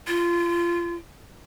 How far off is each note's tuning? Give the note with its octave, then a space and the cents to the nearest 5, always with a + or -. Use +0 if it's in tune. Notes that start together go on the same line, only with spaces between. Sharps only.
F4 -25